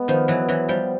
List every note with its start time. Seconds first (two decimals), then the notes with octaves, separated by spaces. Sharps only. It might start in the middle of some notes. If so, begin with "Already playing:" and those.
Already playing: G#3 B3
0.08 D#3 F3
0.28 E3 F#3
0.49 E3 F#3
0.69 F3 G3